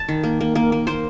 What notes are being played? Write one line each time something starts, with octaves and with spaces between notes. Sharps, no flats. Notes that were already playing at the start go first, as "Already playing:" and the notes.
Already playing: A5
D#3
A#3
A#3
A#3
A#3
A#3 C5